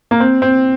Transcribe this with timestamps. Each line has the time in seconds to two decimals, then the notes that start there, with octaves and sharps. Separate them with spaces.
0.11 A#3
0.20 C4
0.42 C4